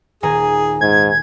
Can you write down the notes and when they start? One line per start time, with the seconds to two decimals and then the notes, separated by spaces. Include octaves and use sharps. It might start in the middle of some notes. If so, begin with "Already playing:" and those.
0.23 D#1 G#4 G#5 A#5
0.81 G#2 G#6